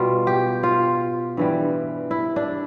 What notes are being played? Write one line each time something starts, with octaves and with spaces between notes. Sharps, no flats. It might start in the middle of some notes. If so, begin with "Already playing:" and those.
Already playing: B2 G3 F4
G4
F4
G2 E3 G3
E4
D4